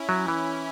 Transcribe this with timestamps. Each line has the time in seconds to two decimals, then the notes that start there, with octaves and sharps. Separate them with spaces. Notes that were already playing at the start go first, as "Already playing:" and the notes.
Already playing: C#4 E4
0.09 F#3
0.28 E3